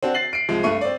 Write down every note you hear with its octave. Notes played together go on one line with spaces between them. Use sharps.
C4 D4 F#4
A6 C7 F#7
C7 D7
C2 F3 G#3
G2 A3 C#6 D#7
C4 D5